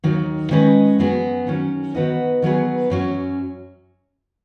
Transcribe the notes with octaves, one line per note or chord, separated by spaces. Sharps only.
D#2 D#3 F#3
D#3 G#3 C#4 B4 D#5
F#2 F#3 B3 G#4
D#3 F#3 C#4
D#3 B3 F#4 B4 D#5
D#3 F#3 B3 G#4 B4
F#2 F#3 C#4